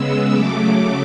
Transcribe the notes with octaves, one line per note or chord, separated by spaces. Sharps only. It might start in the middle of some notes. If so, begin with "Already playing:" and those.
Already playing: C#3 G#3 B3 E6
C#3 F#3 A3 D6